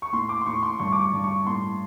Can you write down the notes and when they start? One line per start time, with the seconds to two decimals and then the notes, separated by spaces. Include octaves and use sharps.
0.02 C#6
0.13 A2 C6
0.29 D6
0.41 C6
0.46 A2 C#6
0.63 C6
0.79 G2 C#6
0.92 D6
1.02 C#6
1.13 G2
1.24 C#6
1.46 A2 C6